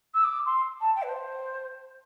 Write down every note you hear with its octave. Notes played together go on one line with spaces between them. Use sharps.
E6
D6
C6
A5
G5
B4
C5